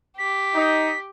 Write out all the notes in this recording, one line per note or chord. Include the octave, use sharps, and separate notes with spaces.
G4 B6
D#4